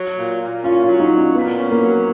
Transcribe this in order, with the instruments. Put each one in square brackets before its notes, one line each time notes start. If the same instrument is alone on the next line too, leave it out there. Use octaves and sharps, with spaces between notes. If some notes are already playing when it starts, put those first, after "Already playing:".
Already playing: [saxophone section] F#3
A#2
A#2
[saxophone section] C#4 [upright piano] F4
[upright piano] F4
[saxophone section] F#3
[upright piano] D#4
[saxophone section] A#2
[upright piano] C#4
[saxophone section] A#2 [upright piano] B3
[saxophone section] C#4
[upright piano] A#3
[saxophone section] F#3